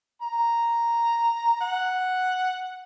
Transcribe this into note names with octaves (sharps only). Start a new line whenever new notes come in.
A#5
F#5